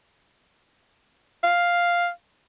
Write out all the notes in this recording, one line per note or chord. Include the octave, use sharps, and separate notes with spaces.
F5